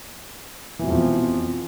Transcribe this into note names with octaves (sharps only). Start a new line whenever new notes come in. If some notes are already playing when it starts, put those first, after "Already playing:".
F2 B2 E3 F3